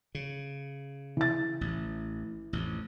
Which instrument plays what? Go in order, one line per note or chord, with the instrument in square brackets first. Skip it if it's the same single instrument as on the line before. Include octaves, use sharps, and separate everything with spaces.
[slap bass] C#3
[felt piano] E3 A6
[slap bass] A1
A1 F2